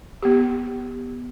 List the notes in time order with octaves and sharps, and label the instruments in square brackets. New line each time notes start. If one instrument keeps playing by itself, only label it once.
[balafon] B3 G4